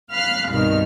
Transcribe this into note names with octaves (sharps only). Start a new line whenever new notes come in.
F5 B5 F6 F#6 C7
C2 G2 B2 D#3 F6